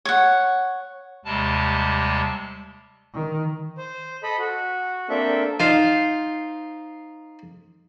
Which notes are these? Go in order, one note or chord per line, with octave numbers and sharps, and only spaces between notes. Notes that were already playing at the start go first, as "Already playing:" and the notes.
C#5 F#5
D#2 C3 G3 G#3 A5
D#3
C5
A4 D#5 B5
F#4
A#3 C4 D4 A4 E5
D#4 F4 C5 F5